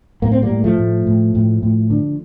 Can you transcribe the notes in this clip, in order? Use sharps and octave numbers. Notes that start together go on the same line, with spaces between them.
A2 A#3
C4
G3 A#3
A2
F3 A3
A2
A2
A2
A2
D3